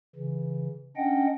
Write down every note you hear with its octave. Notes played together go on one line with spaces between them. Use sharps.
C#3 E3
C#4 D4 D#5 F#5 G5